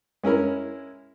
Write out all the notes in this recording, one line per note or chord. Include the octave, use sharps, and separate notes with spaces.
G#3 C#4 E4 A#4